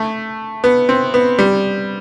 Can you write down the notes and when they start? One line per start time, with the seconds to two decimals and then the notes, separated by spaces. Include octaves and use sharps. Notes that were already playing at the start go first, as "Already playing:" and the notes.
Already playing: A3
0.64 B3
0.89 C4
1.14 B3
1.39 G3